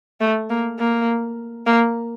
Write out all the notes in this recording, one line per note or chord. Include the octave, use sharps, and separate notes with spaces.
A3
A#3
A#3
A#3